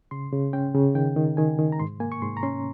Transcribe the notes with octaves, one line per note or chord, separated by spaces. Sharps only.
C#3 C6
C#3
C#4 G5
C#3
D#3 G5
D#3
D#3 G#5
D#3
A#5
G#2 C6
A#3 G#5
C#6
G#2 C6
A#5
C#4 C6